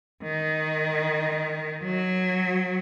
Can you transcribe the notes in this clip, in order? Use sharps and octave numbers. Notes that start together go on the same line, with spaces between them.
D#3
F#3